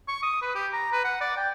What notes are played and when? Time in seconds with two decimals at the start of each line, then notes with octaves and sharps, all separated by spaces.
0.08 C#6
0.23 D#6
0.42 B4
0.55 G4
0.73 A#5
0.92 B4
1.04 F#5
1.21 D5
1.37 G5